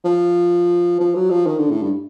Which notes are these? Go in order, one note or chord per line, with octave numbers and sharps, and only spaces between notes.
F3
F3
F#3
F3
D#3
D3
A2
G2